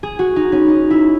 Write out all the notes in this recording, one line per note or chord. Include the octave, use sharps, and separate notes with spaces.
G#4
F#4
D#4
C#4
D#4
E4